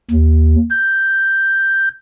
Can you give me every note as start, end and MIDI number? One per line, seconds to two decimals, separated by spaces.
0.11 0.56 39
0.70 1.89 91